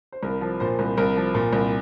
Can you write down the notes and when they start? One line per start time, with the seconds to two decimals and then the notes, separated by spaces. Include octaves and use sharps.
0.12 C5
0.23 C2 A#4
0.41 F3
0.60 A#2 C5
0.79 C2
0.97 C2 A#4
1.16 F3
1.35 A#2
1.53 C2